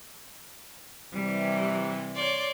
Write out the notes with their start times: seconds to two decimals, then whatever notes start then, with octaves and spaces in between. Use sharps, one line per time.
1.13 C3 E3 G3
2.16 C#5 D5 C6